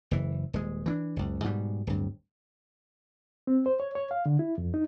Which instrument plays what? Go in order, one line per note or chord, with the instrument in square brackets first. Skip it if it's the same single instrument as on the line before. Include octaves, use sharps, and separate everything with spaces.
[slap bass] F#1 E3
D#1 G#3
E3 C4 D4
F#1 C#2
G#2 B2 G3
D1 G2
[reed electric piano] C4
C5
C#5
C#5
F5
D3
E4
F2
D#4